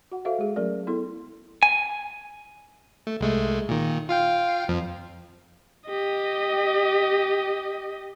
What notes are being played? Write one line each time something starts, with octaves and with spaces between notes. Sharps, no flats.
F#4 F#5
F#4 A4 C5 E5 F5
G#3 G#4
F#3 A3 C#4 A#4 D5
B3 E4 A4 C6
G#5
A3
C2 G#3 A3
A#2 D#3
F4 F5 G5
F2 F3
G4 D#5